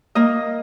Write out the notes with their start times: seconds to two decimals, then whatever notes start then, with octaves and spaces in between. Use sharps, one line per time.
0.15 A#3 D#5